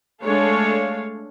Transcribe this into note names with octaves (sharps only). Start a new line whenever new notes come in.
G#3 A3 D4 A4 C#5 F5